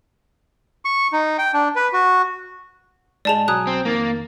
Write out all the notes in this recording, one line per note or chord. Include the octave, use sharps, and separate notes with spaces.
C#6
D#4
G5
D4
B4
F#4
G#2 G#3 D5 A5 F7
B1 F#3 G#5 A#5 D#6 F#6
C4
F2 D#3 A#3 A6